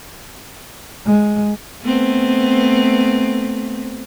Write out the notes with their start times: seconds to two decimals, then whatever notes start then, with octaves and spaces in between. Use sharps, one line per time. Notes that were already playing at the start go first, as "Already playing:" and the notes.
1.07 G#3
1.82 A3 B3 C4